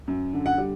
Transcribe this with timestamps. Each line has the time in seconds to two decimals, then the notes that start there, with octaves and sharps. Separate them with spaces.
0.08 F#2
0.33 D3
0.46 F#5
0.58 G3